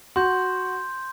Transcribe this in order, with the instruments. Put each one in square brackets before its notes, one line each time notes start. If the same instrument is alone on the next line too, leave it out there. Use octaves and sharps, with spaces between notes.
[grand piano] F#4 [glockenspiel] C6 G6